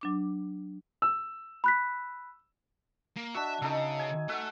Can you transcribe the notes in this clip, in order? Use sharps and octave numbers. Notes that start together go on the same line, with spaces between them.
F#3 D4 D6
E6
B5 F#6 B6
A#3
D4 F#4 E5
C#3 D#4 A4 E5
G#5
A3 E5 F#5